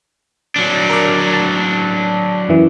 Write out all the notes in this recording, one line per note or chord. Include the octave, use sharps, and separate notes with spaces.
F#3 D4
A#4 D5
A5
F#2 E3